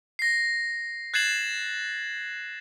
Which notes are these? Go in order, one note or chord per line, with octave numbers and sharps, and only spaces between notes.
A#6 C7
F#6 G#6 A6 C7 E7 F#7